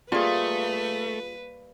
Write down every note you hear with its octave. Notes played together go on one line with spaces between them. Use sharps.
G3 A3 A#3 F4 G#4 B4 C#5